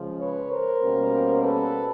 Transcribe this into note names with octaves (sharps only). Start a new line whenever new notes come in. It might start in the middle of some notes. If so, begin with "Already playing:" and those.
Already playing: C#3 F3 G#3
B4 C#5
A#4 C5
B2 G3 A#3 C#4
A4 B4